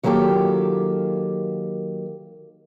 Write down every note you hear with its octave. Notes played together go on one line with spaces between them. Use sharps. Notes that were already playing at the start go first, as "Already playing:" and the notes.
D#3 F#3 A#3 F4 G4 A4